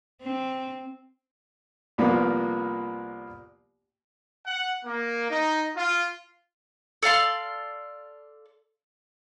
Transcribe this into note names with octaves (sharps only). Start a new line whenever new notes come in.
C4
C2 A#2 F3 A#3 B3
F#5
A#3
D#4
F4
A4 D5 F5 C6